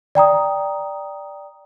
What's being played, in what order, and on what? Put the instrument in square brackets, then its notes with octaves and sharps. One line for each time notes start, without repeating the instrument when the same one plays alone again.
[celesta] D5 G5 A#5 D#6